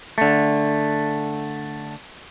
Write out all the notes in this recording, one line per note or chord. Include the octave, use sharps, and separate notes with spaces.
D3 A3